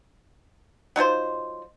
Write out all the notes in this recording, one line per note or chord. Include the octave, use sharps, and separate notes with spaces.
F#3 D#4 F4 C5